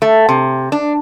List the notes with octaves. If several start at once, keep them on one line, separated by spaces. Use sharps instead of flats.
A3
C3
D4